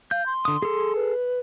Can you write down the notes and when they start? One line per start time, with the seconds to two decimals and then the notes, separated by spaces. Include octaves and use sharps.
0.11 F5 G6
0.26 C6
0.45 D3 D#6
0.62 G#4 A4
0.95 B4